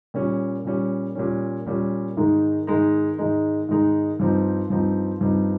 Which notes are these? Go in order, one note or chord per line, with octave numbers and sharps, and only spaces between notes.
A#2 G3 C#4
A#2 G3 C#4
A#2 G3 C#4
A#2 G3 C#4
G#2 D#3 G#3 D#4
G#2 D#3 G#3 D#4
G#2 D#3 G#3 D#4
G#2 D#3 G#3 D#4
G2 F3 C4 D#4
G2 F3 C4 D#4
G2 F3 C4 D#4